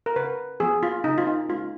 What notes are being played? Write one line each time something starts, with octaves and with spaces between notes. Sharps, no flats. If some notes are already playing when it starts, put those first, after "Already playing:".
A#4
C#3 B4
F3 B3 G#4
F4
C#3 D#4
F4
D#4
G#3 C#4 F4